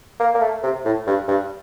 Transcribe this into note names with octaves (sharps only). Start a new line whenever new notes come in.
A#3
A#3
A3
C3
A2
G2
G2